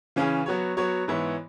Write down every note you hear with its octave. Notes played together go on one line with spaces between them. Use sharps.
C#3 E3 C#4 G#4
F#3 B3 F#4 C#5
F#3 B3 F#4 C#5
G#2 E3 B3 E4 C#5